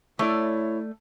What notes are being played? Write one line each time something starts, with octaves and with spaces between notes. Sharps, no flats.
A3 E4 C#5 D5